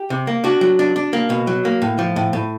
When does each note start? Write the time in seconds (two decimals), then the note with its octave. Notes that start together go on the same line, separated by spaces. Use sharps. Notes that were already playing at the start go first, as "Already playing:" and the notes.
Already playing: G4
0.10 C3
0.27 A#3
0.44 D4 F#4
0.61 F#3
0.79 D4
0.96 D4
1.13 A#3
1.30 B2
1.47 F#3
1.65 A#3
1.82 A2
1.99 F3
2.16 A2
2.33 A2